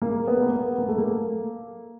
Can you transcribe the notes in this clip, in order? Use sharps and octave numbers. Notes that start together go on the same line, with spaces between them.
A#3
B3
A#3
B3
A#3
A3
A#3